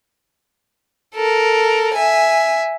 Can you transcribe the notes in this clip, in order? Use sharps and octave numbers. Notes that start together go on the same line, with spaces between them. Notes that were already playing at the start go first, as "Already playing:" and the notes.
A4 A#4
E5 G#5